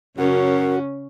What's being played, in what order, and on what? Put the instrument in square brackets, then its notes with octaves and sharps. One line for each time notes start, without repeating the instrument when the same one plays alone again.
[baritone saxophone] F#2 [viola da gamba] C#3 C#4 [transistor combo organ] F#4 [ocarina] A#4